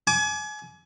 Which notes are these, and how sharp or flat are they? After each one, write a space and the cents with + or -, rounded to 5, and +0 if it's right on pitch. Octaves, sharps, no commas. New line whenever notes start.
G#5 +30 D6 +0